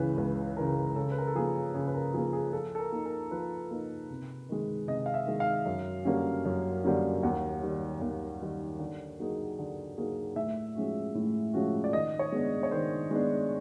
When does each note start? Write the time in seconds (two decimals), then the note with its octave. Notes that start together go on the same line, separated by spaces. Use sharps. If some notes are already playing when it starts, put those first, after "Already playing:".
Already playing: C#2 C#3 E3 B4
0.18 C#2 B4
0.57 C#3 E3 A#4
0.95 C#3 A4
1.11 B4
1.18 A#4
1.27 A4
1.35 F3 A#3 G#4
1.74 C#3 G#4
1.87 B4
1.94 A#4
2.14 F3 A#3 G#4
2.33 G#4
2.53 F3 A4
2.75 A4
2.79 A#4
2.92 A#3 D#4
3.05 A#4
3.31 F3 B4
3.70 A#3 D#4
4.10 C3
4.49 D#3 G#3
4.87 C3 D#5
5.06 F5
5.14 E5
5.27 D#3 G#3
5.40 F5
5.66 F#2
6.05 D3 G3 A#3 C#4
6.45 F#2
6.84 D3 G3 A#3 C#4
7.23 D#2 F#5
7.62 D#3 G3
8.01 D#2
8.41 D#3 G3
8.79 D3
9.19 F#3 A#3 D#4 G#4
9.59 D3
9.97 F#3 A#3 D#4 G#4
10.36 A2 E5
10.75 F3 G#3 C#4 F#4
11.15 A2
11.53 F3 G#3 C#4 F#4
11.84 D5
11.93 D#3 D#5
12.19 C#5
12.32 G#3 B3 D4
12.63 C#5
12.71 D#3 C5
13.11 G#3 B3 D4